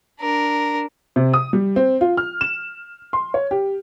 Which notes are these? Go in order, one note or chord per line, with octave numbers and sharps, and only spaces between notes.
D4 A#4
C3
D#6
G3
C4
F4
F6
E7
C6
C#5
G4